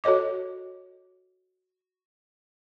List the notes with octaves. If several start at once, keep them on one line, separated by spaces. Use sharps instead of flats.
F#4 A4 C#5 D#5 D6